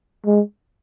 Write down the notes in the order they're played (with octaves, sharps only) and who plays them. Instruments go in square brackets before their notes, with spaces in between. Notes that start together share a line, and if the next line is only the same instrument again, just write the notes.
[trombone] G#3